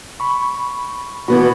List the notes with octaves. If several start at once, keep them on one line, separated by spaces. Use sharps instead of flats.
B5 C#6
E3 B3 F#4 B4 B5